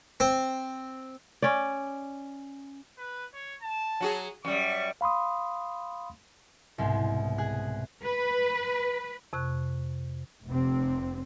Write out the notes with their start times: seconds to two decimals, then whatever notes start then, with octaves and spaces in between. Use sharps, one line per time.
0.20 C4
1.42 C#4 D5
2.98 B4
3.33 C#5
3.62 A5
4.01 F#3 F#4 G#4
4.45 F#2 G3 C#6
5.01 F5 B5 C6 D#6
6.78 C2 G#2 B2 G#3
7.38 G#4 F#6
8.03 B4
9.33 F2 C3 C#6 F#6
10.46 F1 C3 C4